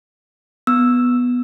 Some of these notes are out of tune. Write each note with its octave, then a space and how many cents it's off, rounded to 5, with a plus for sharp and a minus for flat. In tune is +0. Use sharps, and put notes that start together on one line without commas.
B3 +0 E6 +0